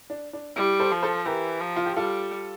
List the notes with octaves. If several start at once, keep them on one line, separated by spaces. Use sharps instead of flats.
D4
D4
G3 E4
A4 C5
F3
A4 C5
E3 G4 A#4
F3
F4
G4
G3 F4 A4